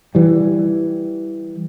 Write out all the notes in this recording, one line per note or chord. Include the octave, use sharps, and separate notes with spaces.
E3 G3